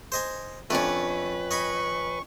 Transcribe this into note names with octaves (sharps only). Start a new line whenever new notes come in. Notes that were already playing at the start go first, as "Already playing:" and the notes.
C5 D#5 G#5
F2 A3 C#4 D4 B4
D#5 G#5 B5 C#6